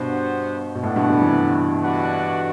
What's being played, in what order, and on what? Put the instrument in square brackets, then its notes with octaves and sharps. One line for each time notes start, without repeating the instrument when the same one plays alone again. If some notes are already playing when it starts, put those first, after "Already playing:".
Already playing: [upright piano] G2 B2 [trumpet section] G3 B3 F#4 C5
[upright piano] B2
[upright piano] A2 [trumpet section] B3 F#4 B4 D5 F#5
[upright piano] G2 B2
B2 D3
C3 E3
[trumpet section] D4 F#4 B4 D5 F#5